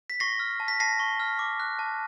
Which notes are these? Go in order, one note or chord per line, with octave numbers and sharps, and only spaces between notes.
B6
C#6 A#6 C7
F6
A5
B6
A5 A#6 C7
C#6
F6
D6
F#6
A5